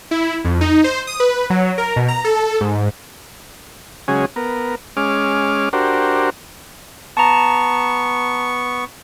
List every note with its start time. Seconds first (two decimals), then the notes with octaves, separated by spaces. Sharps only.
0.11 E4
0.45 F2
0.61 D#4
0.84 C5
1.07 D#6
1.20 B4
1.50 F#3
1.78 A#4
1.96 B2
2.08 A#5
2.24 A4
2.61 G#2
4.08 C#3 F#3 G#3 C#4 G#4
4.36 B3 A#4
4.97 G#3 C#4 D6 F6
5.73 D4 F#4 G4 A#4 C5
7.17 B3 A5 A#5 C#6